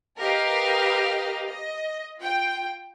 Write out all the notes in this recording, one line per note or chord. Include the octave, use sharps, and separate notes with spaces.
G4 A#4 B4 D#5 F5 F6
D#5
F4 G5